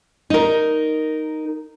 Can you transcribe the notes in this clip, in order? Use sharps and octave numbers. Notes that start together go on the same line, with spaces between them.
D#4 A#4